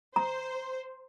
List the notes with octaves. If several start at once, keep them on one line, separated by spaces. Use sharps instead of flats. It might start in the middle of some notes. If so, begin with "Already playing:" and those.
C5 A#5